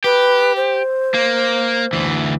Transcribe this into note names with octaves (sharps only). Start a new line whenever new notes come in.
G4 B4
C5
A#3
D2 E3